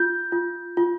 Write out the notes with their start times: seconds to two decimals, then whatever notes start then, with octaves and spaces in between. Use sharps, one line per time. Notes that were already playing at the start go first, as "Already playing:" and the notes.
Already playing: F4 G6
0.32 F4
0.77 F4